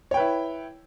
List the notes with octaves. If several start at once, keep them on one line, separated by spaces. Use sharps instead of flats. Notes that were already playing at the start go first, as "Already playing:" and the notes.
E4 B4 C#5 G5